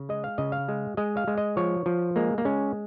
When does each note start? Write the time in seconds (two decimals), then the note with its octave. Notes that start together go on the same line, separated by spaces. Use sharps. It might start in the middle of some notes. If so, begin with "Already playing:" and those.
Already playing: C#3
0.09 G#3 D#5
0.24 F5
0.38 C#3 D#5
0.52 F5
0.69 G#3
0.97 G#3 D#5
1.17 F5
1.28 G#3
1.38 D#5
1.57 F3 C#5
1.86 F3
2.16 G#3 A#3
2.38 A#3
2.45 G#3 C#4